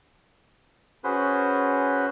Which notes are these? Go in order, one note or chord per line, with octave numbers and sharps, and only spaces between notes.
C#4 F#4 G#4 B4 C5